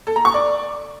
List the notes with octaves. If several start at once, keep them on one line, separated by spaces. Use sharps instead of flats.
A4
A#5
C#6
D5